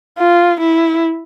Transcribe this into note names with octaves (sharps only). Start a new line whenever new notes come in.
F4
E4